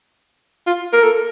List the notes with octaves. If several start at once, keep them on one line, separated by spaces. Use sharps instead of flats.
F4
A#4
A4